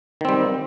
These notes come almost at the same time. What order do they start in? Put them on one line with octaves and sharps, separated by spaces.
D#3 C4 G3